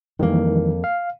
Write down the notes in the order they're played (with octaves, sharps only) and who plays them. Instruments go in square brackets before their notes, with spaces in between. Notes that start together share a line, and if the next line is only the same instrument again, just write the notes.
[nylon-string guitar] F2 A#3 [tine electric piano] D#3 E3 G3
[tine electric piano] F5